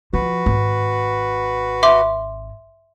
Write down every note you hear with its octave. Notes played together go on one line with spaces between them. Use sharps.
F3 F#4 B4
G#1
E5 C6 D6